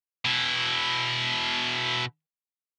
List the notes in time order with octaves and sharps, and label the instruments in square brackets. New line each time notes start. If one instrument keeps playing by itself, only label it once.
[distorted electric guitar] B2 E4